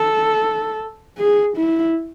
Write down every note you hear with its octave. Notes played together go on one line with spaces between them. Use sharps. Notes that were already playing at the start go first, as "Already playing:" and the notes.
Already playing: A4
G#4
E4